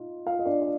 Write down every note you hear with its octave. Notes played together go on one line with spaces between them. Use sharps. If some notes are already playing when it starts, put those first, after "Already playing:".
Already playing: A#2 D#4 F4
F4 F5
D#5
D4 D5
D5